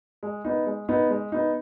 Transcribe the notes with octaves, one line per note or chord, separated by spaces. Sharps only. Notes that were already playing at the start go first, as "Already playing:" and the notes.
G#3
B3 D#4
G#3
B3 D#4
G#3
B3 D#4